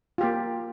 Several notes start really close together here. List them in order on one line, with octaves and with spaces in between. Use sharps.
F4 G4 A#3